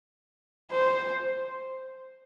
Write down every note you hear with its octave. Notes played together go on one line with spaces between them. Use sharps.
C5